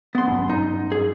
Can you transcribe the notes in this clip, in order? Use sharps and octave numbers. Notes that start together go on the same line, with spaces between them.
B3 C6
G2 F#3 C#4
D#4
G#4